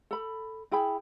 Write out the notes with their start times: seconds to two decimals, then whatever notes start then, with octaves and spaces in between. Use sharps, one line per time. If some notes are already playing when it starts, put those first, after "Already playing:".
0.11 A4 B5
0.72 E4 G#4 G5 B5